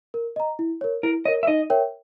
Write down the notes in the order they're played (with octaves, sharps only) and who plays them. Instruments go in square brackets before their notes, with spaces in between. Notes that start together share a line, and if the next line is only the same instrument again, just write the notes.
[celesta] A#4
D#5 A#5
E4
A#4 C#5
[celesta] E4 [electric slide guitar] A#4
[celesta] C#5 [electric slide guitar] D#5
[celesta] A#4
[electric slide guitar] E5
[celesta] D#4 [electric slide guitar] D#5
[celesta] A#4 C#5 E5 G5